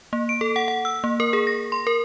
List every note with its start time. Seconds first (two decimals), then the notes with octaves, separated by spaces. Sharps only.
0.13 A#3
0.29 D7
0.41 A4
0.56 F#5
0.68 F#5
0.85 E6
1.04 A#3
1.20 A#4
1.33 G#4
1.47 A#6
1.72 C6
1.87 A#4